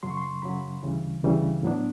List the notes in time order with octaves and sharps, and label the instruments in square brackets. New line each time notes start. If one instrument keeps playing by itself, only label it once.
[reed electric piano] F#2 C#3 F#3 C6
C#6
C6
F#2 C#3 F#3 B5
D2 C#3 E3 G3
D2 C#3 E3 G3
A2 F#3 B3 D4